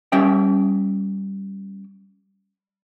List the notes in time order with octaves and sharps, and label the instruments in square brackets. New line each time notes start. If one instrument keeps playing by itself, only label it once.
[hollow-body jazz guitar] G3 C#4 E5 G5